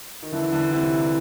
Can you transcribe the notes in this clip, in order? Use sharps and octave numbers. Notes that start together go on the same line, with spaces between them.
D#3
D3 E3
D3
C3 E3